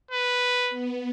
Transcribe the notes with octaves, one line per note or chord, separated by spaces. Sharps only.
B4
B3